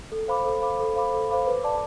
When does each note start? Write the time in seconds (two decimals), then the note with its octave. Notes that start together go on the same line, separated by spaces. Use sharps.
0.12 A4
0.28 C5 F5 B5 D6
0.45 A4
0.62 C5 F5 B5 D6
0.80 A4
0.96 C5 F5 B5 D6
1.13 A4
1.30 C5 F5 B5 D6
1.46 B4
1.64 D5 A5 D6